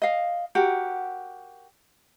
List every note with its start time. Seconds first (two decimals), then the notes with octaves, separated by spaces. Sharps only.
0.02 D#5 F5
0.55 F#4 G4 A#4 F#5